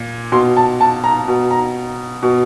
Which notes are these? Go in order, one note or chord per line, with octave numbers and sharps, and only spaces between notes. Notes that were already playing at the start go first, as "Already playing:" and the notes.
Already playing: A#2
B2 C6
A5
A5
A#5
B2
A#5
B2